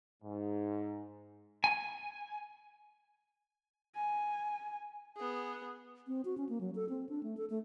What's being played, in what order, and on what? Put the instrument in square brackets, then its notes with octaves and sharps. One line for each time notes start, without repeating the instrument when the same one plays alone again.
[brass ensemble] G#2
[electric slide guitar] G#5
[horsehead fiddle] G#5
[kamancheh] B3 G#4
[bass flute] C4
F#4
C#4
A#3
F#3
A4
C4
D4
A3
A4
A3